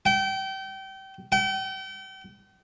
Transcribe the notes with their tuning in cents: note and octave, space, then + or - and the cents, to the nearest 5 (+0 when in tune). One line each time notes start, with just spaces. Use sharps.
G5 -30
G5 -40